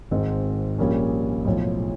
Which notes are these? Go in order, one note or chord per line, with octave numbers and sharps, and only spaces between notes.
G#1 G#2 D#3 G#3 C4
A#1 A#2 G3 A#3 C#4
B1 A2 F3